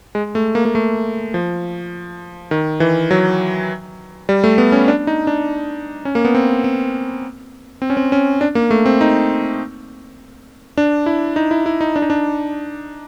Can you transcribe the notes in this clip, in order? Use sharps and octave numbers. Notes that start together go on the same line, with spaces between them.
G#3
A3
A#3
A#3
A3
F3
D#3
E3
F#3
G3
A3
B3
C#4
D4
D#4
D4
C#4
A#3
B3
C4
C4
C4
C#4
C4
C#4
D4
A#3
A3
C4
D#4
D4
E4
D#4
E4
E4
D#4
D4
D#4
D4